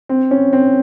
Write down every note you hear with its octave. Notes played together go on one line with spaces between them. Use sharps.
C4
C#4
C4